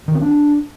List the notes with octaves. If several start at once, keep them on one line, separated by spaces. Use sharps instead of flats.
D#3
C4
D4